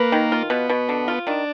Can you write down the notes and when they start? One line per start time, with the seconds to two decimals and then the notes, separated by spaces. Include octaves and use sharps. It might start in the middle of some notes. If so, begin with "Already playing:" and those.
Already playing: A#3 B4
0.12 D#3
0.32 F4
0.50 B2 B3
0.69 B2
0.89 D3
1.08 F4
1.27 D#3 D4